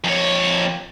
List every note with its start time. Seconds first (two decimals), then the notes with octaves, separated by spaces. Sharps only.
0.04 F2 C#5